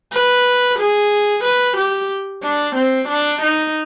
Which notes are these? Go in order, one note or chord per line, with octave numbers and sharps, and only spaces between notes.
B4
G#4
B4
G4
D4
C4
D4
D#4